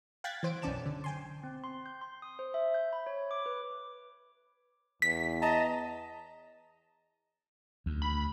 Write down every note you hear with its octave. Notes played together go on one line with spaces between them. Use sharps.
F5 G5 F#6 G#6 A6 B6
E3 C5 D7
B1 F#2 C#4 D5 A5 E7
D3
G5 G#5 C6
C4
C6
G6
C6
D#6
C5
E5
G6
B5
C#5
D6
B4
E2 B6
D#5 A5 A#5
D2
B5